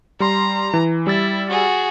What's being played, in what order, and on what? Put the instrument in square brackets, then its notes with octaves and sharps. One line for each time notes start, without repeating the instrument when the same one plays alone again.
[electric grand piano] G3 C6 [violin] A#5
[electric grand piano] E3
[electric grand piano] G3 E6 A6 [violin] E4
[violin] F#4 G#4